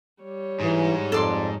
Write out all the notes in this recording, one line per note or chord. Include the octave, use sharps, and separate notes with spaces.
G3 C#5
G#2 E3
F2 A4 D5 C6